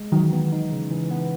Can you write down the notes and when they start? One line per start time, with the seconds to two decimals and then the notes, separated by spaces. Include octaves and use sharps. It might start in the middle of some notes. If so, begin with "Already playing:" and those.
Already playing: G#3
0.12 D#3 E3 F#3
0.33 B3
0.52 D#4
0.72 C#3
0.91 E3
1.11 B3